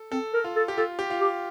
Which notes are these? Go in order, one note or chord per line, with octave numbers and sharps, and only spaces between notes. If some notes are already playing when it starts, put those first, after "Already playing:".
Already playing: A4
C4 A4
A#4
F4
A4
G4
F4 A4
G4
F4
G4